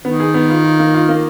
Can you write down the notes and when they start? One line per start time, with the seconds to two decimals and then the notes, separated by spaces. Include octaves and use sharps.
0.05 D#3 B3
0.20 G#4
0.34 B3
0.50 F4
0.64 F4
0.79 A#3
0.94 F4
1.09 A#3